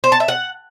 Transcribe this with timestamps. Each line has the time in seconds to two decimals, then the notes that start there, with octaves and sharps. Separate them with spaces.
0.04 C5
0.12 A5
0.20 E5
0.28 F#5